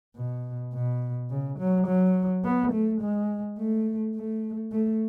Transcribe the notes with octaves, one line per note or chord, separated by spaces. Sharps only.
B2
B2
C#3
F#3
F#3
B3
A3
G#3
A3
A3
A3